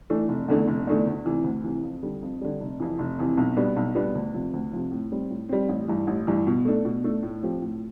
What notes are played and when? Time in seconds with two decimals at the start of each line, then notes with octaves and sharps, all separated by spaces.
0.10 E3 A3 D4
0.29 F1
0.48 E2 D3 A3 D4
0.67 F1
0.87 E2 D3 A3 D4
1.07 D2
1.25 C3 E3
1.44 D2
1.64 C3 E3
1.83 F2
2.03 D3 G3
2.22 F2
2.41 D3 G3
2.60 F1
2.80 F2 C3 E3
2.99 F1
3.19 F2 C3 E3
3.37 B1
3.57 B2 G3 B3 D4
3.76 B1
3.95 B2 G3 B3 D4
4.15 D2
4.34 C3 F3
4.53 D2
4.73 C3 F3
4.91 A2
5.12 G3 C4
5.30 A2
5.49 G3 C4
5.69 A1
5.88 G2 E3
6.07 A1
6.27 G2 E3
6.47 B2
6.65 A3 D4 A4
6.85 B2
7.04 A3 D4 A4
7.23 A2
7.43 F3 C4 G4
7.62 A2